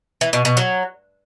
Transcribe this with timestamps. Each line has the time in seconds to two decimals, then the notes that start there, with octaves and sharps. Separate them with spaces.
0.21 E3
0.33 B2
0.45 B2
0.57 F#3